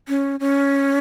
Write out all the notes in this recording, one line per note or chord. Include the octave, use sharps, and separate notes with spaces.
C#4
C#4